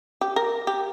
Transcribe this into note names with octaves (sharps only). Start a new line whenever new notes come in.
G4
A#4
G4